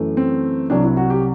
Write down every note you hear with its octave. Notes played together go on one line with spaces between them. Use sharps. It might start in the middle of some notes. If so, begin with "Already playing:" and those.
Already playing: F#2 E3 A3
C4
C2 C3 F#3 D4
E4
F#4
G4